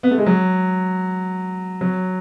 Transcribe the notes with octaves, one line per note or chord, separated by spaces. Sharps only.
B3
A3
G#3
F#3
F#3